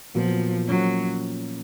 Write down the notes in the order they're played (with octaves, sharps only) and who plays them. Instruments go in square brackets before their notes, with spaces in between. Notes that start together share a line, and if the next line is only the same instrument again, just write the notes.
[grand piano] A#2 F#3 B3 [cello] F3
[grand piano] F3 A#3 C#4 [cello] F#3